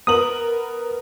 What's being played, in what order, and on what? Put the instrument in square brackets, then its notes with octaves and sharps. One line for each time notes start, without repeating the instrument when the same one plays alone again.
[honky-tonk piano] B3 A#4 F#7 [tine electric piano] D#6